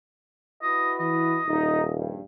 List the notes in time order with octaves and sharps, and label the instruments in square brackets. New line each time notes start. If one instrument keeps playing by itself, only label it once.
[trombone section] E4 F#4 B4 [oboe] D#5
[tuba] E3 [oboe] D#5
[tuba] D#1 [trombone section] D#4
[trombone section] A#1 G2